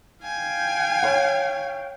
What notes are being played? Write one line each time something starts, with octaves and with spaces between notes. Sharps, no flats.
F5 G5 G#5
C#5 F#5